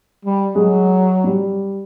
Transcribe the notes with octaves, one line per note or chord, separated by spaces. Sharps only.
G3
F#3 G#3
G3